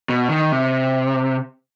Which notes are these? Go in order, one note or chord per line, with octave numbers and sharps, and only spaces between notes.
B2
D#3
C3